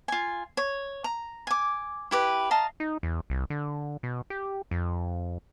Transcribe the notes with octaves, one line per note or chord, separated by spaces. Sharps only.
F4 G#5
C#5
A#5
G#5 D6
E4 G4 B4
D#5 F5 A5 A#5
D#4
E2
C2
D3
B2
G4
F2